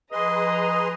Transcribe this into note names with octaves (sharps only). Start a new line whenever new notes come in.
F3 G#4 B4 D#5 A#5 C6 D#6